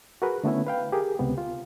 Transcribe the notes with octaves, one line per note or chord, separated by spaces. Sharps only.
F#4 G#4 A#4 B4
D3 A3 B3 C#4 E4
B4 F5 G5
G4 G#4 A#4
C#2 C3 B3
F4